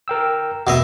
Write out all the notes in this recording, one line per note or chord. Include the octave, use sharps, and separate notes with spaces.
A#4 G5 E6
E2 B2 D#5 E5